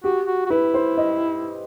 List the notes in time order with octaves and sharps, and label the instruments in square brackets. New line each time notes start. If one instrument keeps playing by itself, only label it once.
[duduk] F#4 [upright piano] G4
[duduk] F#4
F#4
[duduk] E4 [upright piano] B4
[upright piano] C5
D#5